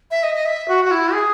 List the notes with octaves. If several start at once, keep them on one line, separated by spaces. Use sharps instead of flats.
E5
D#5
D#5
E5
F#4
F#4
E4
G#4